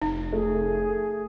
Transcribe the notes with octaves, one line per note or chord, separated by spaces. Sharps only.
F1 D#4
A3 G#4